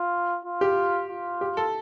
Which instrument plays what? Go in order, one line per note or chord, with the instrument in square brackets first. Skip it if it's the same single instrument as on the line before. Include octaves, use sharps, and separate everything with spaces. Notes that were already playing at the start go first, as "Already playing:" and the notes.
Already playing: [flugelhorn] F4
F4
[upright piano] G4
[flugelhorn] F4
[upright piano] G4
A4